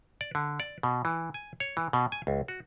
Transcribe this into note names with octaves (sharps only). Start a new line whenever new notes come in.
D5
D3
D5
B2
E3
G#5
C#5
E3
B2
G#5
C#2
F#4